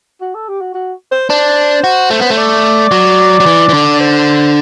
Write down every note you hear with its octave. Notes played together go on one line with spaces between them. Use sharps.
F#4
A4
G4
F#4
F#4
C5
D4 C5
F#4
A3
B3
A3 C5
D5
F#3
F#3
E3
E3
D3
C5